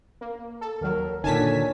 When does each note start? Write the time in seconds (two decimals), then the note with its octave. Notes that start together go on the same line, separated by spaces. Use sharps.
0.21 A#3
0.61 A4
0.81 D#2 F#3 A#4
1.24 A#2 D3 D#3 C#5 G#5 A5 B6